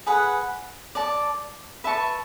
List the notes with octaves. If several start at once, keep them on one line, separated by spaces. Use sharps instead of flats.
G#4 B4 F#5
D5 A5 D6
B4 E5 A5 C#6